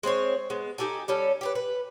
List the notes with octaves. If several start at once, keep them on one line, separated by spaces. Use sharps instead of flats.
G#3 C4 C5 C#5
G#3 B3
D#4 G4 A4 G#5
G3 C#4 A4
G4 G#4 B4
B4